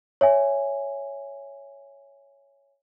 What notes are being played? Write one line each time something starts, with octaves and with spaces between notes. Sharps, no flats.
C#5 E5 G#5